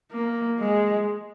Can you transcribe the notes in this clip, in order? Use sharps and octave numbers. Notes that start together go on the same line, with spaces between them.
A#3
G#3